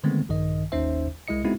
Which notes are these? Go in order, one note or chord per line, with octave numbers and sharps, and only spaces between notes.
D3 D#3 G#3 A3 B3 C4
A#1 G2 D#3 D#5
G1 D#2 C#4 D#4 C5 E5
C2 G#3 E4 D#5 C#7
G#3 B3 C4 D#4 E4 F#4